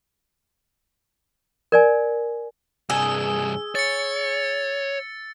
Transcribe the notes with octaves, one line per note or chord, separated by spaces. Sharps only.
A#4 D5 G#5
C2 G2 G#4 E6
C#5 A6 C#7